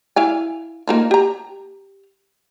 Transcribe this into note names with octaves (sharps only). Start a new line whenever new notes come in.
E4 F5 G#5
A#3 D#4 F4
G4 A#5